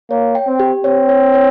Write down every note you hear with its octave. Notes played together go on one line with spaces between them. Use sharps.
A#3 C#5
G5
C4
G4
C4 C#5
C#5
C#5